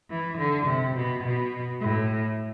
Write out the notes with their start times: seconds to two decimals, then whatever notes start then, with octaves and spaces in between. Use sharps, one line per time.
0.10 E3
0.38 D3
0.67 C3
0.95 B2
1.24 B2
1.81 A2